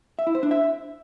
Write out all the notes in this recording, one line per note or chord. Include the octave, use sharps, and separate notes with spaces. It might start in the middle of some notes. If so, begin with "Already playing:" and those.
E5
E4
C5
D4
E5